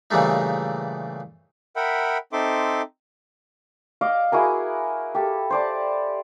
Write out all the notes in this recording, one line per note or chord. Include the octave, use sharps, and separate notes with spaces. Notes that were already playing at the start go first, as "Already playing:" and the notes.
A#2 C#3 E3 G3 A3 D#4
A#4 E5 F#5 G5 B5
C4 D#4 A4 E5 C6 D6
D#5 F5 D6
E4 F#4 G#4 A#4
G4 A4
C5 D5 A5